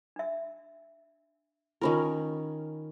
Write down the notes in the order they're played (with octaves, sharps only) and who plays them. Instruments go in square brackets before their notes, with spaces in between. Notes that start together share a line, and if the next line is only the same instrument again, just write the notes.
[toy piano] D4 E5
[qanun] D#3 C#4 A#4 [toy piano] E4 F4 B5